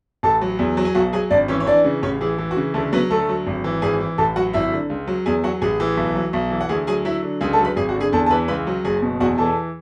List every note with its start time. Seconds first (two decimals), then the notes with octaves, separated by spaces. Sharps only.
0.23 A1 A4 A5
0.41 F#3
0.59 E2
0.77 F#3
0.85 G#5
0.95 B1 F#4 F#5
1.13 F#3 G#4 G#5
1.30 G#1 D4 D5
1.48 E3 C#4 C#5
1.60 C#5
1.66 E3 D4 D5
1.84 C#3
2.02 A1 C#4 C#5
2.21 E3 G#4
2.38 E3
2.51 F#4
2.57 C#3
2.74 D2 A3 A4
2.93 F#3 B3 B4
3.10 D2 A3 A4
3.29 F#3
3.47 G#1
3.64 E3
3.82 G#1 G#4 G#5
4.00 E3
4.18 A1 A4 A5
4.36 F#3 F#4 F#5
4.53 G#1 E4 E5
4.72 D3
4.90 C#2
5.07 F#3
5.26 E2 G#4 G#5
5.43 F#3 F#4 F#5
5.62 A1 G#4 G#5
5.80 E3
5.97 B1
6.15 F#3
6.33 B1
6.51 E3
6.61 F#5
6.69 D2 G#4 G#5
6.87 F#3 G#4 G#5
7.05 F#3 E4 E5
7.23 D3
7.41 C#2 G#4 G#5
7.53 A4 A5
7.59 F#3
7.65 B4 B5
7.76 G#1 G#4 G#5
7.89 F#4 F#5
7.95 D3
8.01 G#4 G#5
8.12 E2 A4 A5
8.26 A5
8.31 E3 B4 B5
8.48 C#2 B4 B5
8.67 F#3
8.84 F#1 G#4 G#5
9.02 B2
9.20 E2 F#4 F#5
9.38 E3 A4 A5